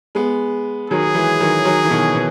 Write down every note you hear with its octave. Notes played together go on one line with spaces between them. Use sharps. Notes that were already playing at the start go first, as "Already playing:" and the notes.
G#3 B3
D#3 F#3 G#4
E3 G#3
D#3 F#3
D#3 F#3
E3
B2 D#3
B2